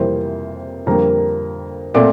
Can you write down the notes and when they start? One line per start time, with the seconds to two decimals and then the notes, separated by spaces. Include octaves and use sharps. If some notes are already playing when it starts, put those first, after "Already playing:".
Already playing: F2 C3 E3 G3 A#3 C5
0.87 F2 D3 G3 A#3 A#4 A#5
1.94 A#2 A3 C4 D5 D6